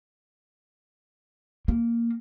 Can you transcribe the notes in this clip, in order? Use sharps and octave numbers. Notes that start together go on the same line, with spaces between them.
A#3